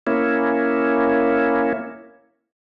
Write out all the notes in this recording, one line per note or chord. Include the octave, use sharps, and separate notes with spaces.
A#3 C#4 E4